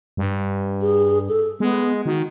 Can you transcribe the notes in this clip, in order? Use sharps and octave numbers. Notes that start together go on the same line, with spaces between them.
G2
G#4
A4
G#3 B3
D#3 F#4